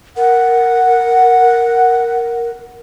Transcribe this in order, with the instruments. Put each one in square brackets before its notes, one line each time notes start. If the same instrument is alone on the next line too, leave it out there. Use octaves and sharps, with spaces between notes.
[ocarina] A#4 [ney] F#5